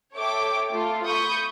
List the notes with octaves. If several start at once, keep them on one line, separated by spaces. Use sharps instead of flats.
A4 C#5 E5 G5 D6
A3 F4
B5 C#6 D#6 G6